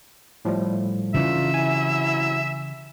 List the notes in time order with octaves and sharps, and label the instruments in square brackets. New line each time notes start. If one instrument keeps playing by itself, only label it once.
[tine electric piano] A2 F3 G3
[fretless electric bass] C#3 E3 [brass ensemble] D4 D#4 F4 [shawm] E5
[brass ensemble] C3 F#3 E4 [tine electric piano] G#5